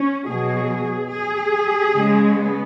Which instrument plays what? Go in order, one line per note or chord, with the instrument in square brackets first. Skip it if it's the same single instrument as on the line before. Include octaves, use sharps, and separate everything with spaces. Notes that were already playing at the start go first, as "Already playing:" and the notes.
Already playing: [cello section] C#4
B2 F#3 G#4
G#4
C#3 G#3
B3